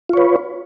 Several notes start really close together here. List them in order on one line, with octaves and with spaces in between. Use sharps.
F4 C#5 B4